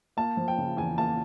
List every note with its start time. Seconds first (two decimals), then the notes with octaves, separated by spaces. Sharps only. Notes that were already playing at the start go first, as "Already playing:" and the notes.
0.17 A#3 A5
0.37 F3
0.48 G5
0.58 C#3
0.77 E2 G#5
0.98 A#3 A5